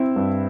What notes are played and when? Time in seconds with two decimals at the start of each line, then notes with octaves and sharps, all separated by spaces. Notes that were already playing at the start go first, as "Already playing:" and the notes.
Already playing: C4 E4
0.16 G2